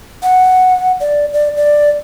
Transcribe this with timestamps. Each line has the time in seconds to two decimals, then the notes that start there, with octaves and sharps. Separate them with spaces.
0.23 F#5
1.00 D5
1.33 D5
1.57 D5